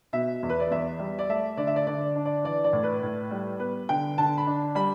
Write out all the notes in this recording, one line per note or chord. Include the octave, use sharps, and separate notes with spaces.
B2 E5
E2
B4
D5
E2 E5
G3
D5
A3 E5
D3 D5
E5
D5
D3 D5
D4
D5
E3 D5
D5
A2
B4
A2
G3
B3 B4
D3 G5
D3 A5
B5
D4
G3 B5